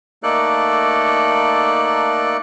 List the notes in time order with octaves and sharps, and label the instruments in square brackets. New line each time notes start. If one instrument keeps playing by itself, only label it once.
[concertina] A3 A#3 D#4 A4 D5 F#6